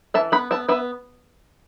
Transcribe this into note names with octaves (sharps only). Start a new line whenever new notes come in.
E3 E5 A5
B3 F#5 B5
B3 E5 A5
B3 B4 E5